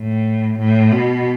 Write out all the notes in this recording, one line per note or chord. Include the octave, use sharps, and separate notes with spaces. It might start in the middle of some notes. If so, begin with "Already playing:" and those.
Already playing: A2
A2
B2